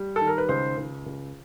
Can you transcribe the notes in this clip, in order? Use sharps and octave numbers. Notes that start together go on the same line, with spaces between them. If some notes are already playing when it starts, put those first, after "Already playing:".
Already playing: G3
A4
D#3
A#4
B4
C#2 C5
C#2
C#2